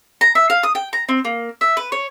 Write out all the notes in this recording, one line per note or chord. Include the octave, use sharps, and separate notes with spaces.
A#5
E5
F5
D#6
G5
A#5
C4
A#3
E5
B4
C#5